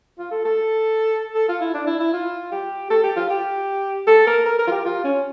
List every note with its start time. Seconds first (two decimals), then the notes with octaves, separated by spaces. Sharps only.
0.19 F4
0.31 A4
0.45 A4
1.35 A4
1.49 F4
1.61 E4
1.74 D4
1.87 E4
2.00 E4
2.13 F4
2.52 G4
2.91 A4
3.04 G4
3.16 F4
3.30 G4
4.07 A4
4.27 A#4
4.46 A#4
4.59 A#4
4.67 F4
4.72 G4
4.85 F4
5.04 C#4